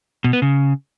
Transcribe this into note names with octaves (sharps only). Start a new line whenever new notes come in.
B2
B3
C#3